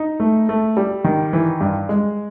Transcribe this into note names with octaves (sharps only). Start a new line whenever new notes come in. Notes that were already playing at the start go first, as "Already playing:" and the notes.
Already playing: D#4
A3
A3
G3
D#3
E3
G2
G#3